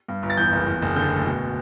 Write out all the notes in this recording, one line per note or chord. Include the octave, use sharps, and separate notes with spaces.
G2
G1
A6
E2 G6
F#1
E2
F#1
D3 G6
D2
B2